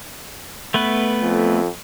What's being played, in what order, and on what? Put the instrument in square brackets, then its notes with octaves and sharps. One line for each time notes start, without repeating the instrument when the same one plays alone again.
[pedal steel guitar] A3 B3 B4
[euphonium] F2